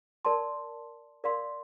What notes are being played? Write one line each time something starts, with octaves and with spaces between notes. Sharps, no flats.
A#4 D5 A5 C6
A#4 D5 F5 C6